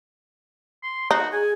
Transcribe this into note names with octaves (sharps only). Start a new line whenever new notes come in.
C6
D#4 F#4
G#4 G#5